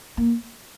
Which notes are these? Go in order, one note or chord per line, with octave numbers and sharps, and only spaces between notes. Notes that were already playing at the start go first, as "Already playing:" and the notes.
A#3